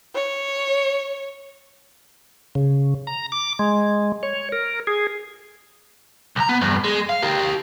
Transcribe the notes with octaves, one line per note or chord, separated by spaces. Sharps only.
C#5
C#3
A#5
D6
G#3
C#5
A#4
G#4
C2 A#5
B3
E2 G2
G#3
F5
G4 A#4